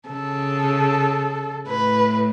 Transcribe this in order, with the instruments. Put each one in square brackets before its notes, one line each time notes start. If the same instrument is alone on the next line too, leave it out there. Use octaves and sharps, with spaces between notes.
[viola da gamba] C#3 [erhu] A4
[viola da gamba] A2 [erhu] B4